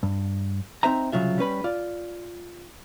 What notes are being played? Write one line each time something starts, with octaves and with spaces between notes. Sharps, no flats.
G2
C4 D#4 C5 E5 A#5
C2 A#2 C#3 F#3 F4 E5
G3 C#4 B4 B5
F4 D5